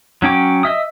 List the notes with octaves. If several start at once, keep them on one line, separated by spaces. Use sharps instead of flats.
F#3 C#4 G5 D6
D#5 E5 D#6